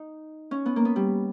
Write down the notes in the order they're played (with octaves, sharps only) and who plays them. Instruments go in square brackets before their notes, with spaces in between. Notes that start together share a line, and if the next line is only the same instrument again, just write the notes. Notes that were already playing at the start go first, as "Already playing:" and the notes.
Already playing: [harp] D#4
C#4
B3
A#3
B3
G3